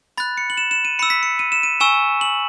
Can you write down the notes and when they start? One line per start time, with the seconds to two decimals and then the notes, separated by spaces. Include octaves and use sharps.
0.18 B5 F#6 A6
0.37 C#7
0.50 F#7
0.57 E7
0.71 E7
0.85 D#7
0.99 B5 E6 C#7
1.10 B6
1.23 C#7
1.39 D#7
1.52 E7
1.63 D#7
1.80 G#5 C#6 E6 E7
2.21 F#7